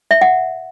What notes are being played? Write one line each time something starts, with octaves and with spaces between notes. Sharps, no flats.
E5
F#5